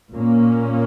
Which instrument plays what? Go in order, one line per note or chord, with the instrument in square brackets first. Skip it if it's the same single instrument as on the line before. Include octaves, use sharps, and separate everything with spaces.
[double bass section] A#2 A#3 C#4